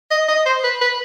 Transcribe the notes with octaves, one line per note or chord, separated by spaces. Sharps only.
D#5
D#5
C5
B4
B4